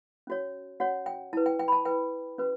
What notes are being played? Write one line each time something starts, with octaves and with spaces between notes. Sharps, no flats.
C#4 F#4 C#5
C#4 F#4 C#5 F#5
G5
E4 B4 A5
G5
G5
B5
A5
E4 B4 G5
C#4 F#4 B4